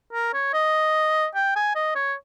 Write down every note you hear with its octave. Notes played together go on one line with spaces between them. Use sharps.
A#4
C#5
D#5
G5
G#5
D#5
C#5